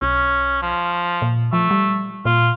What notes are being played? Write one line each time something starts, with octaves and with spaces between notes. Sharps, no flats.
B1 C#4
F3
A#2
F3 A3
G3
A#2 F4